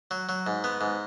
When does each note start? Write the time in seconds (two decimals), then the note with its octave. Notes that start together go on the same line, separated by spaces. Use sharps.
0.11 F#3
0.29 F#3
0.47 G#2
0.64 B3
0.81 G#2